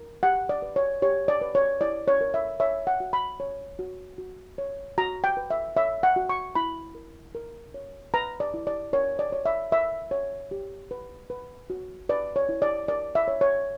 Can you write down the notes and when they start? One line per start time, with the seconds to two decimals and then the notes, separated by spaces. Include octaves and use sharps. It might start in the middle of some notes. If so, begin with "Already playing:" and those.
Already playing: A#4
0.23 G4 F#5
0.49 D5
0.62 B4
0.76 C#5
1.02 G4 C#5
1.28 D5
1.41 B4
1.55 C#5
1.81 E4 D5
2.08 C#5
2.21 A#4
2.34 E5
2.60 C#5 E5
2.87 F#5
3.00 F#4
3.13 B5
3.40 C#5
3.79 F#4
4.18 F#4
4.58 C#5
4.98 F#4 A#5
5.24 G5
5.37 B4
5.50 E5
5.76 C#5 E5
6.03 F#5
6.16 F#4
6.29 C#6
6.55 E4 B5
6.95 A#4
7.35 A#4
7.74 C#5
8.14 B4 A#5
8.40 D5
8.54 E4
8.67 D5
8.93 A#4 C#5
9.19 D5
9.32 C#5
9.45 E5
9.72 A#4 E5
10.11 C#5
10.51 G4
10.91 B4
11.30 B4
11.70 F#4
12.09 B4 D5
12.36 C#5
12.49 E4
12.62 D5
12.88 A#4 D5
13.15 E5
13.28 C#5
13.41 C#5